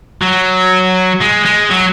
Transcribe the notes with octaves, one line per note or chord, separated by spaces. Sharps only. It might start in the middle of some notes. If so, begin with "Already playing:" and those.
F#3
G#3
G#3
F#3